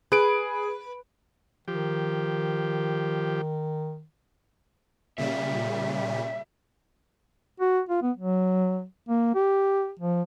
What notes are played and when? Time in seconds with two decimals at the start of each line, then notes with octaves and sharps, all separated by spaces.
0.12 G#4 B4 D7
1.68 D#3 F3 G4
5.18 A#2 C#3 G3 E5
7.60 F#4
7.89 F4
8.02 B3
8.17 F#3
9.09 A#3
9.35 G4
9.99 F3